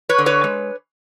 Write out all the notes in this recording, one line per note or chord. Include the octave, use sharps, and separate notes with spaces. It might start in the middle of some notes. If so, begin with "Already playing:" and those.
B4 C#5
D3
B4 C#5
G#3